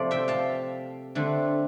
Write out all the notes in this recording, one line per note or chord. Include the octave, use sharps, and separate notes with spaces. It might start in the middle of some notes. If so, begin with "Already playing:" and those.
Already playing: C3 F3 A3 C4 C5 D5
E5 G5
F5 A5
D3 A3 C4